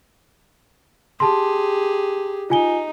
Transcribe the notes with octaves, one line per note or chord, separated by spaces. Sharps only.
G4 G#4 A5 C6
D#4 F4 G#5 G7